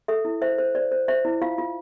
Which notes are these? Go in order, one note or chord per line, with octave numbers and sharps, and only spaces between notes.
A4 E5
E4
C5 E5
C5
C5 D5
C5
C5 E5
E4
F4 F5
F4